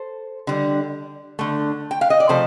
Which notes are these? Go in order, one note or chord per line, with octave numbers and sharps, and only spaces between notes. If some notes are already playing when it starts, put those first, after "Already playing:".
Already playing: A4 C5
D3 G3
D3 A3
G5
F5
D#5
D5
C3 F3 A3 A4 C5